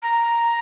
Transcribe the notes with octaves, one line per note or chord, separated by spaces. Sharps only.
A#5